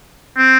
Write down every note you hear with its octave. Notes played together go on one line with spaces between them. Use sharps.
C4